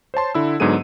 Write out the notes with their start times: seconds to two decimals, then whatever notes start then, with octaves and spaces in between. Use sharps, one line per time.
0.14 C5 C#5 A5 C6
0.35 D3 E4 E6
0.60 G#2 D3 F#3 B3 G#4 D#7